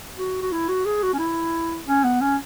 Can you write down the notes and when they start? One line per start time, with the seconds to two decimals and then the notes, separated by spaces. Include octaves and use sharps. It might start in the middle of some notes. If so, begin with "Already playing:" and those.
0.18 F#4
0.42 F#4
0.52 E4
0.68 F#4
0.86 G#4
1.03 F#4
1.13 C#4
1.19 E4
1.87 C#4
2.04 B3
2.21 C#4